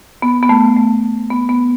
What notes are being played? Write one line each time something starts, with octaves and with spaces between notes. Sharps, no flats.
B3
B3
A3
A3
B3
B3